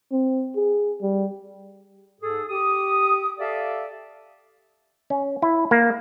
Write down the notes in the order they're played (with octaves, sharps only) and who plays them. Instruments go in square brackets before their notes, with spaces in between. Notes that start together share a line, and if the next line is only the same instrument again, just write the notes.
[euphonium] C4
G#4
G3
[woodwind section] G#2 G#4 A4
G4 D#6
G4 A4 D5 E5 F5
[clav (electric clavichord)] C#4
E4
A#3